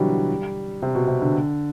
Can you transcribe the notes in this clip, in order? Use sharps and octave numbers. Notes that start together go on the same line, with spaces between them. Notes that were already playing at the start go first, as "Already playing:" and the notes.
Already playing: B2 D3 E3 F#3 G3
C3
B2
C3
D3